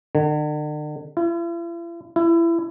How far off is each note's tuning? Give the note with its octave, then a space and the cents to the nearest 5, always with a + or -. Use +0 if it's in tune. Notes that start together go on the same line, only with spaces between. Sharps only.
D3 +45
E4 +45
E4 +25